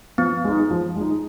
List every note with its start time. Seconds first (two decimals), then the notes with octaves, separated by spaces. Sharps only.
0.18 F3 B3
0.44 G#3 D#4
0.71 F3
0.96 G#3 D#4